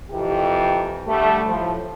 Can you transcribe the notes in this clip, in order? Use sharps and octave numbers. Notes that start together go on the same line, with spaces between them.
F2 C3 E3 G4
D3 G3 A3
A2 F3